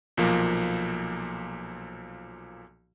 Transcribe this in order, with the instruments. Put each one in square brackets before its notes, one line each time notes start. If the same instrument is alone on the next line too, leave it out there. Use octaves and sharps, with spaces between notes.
[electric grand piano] B1 A#2 F3 A#3